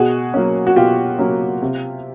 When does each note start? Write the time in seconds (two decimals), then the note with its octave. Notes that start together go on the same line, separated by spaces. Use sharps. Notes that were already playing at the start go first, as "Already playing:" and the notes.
Already playing: B2 F#4 G#4
0.34 F#3 A#3 C#4
0.67 F#4
0.76 B2 F4 G4
1.19 F#3 A#3 C#4
1.62 C3